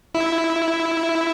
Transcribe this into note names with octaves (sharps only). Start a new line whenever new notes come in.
E4